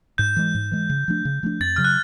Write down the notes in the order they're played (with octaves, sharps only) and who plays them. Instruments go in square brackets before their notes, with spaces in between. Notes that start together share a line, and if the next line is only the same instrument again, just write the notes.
[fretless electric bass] G#2 [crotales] G6
[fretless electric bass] E3 G#3
G#2
E3 G#3
C#3
F3 A3 D4
C#3
F3 A3 D4
[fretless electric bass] F2 [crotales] A6
[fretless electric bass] C#3 F#3 [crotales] F6
[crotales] F#6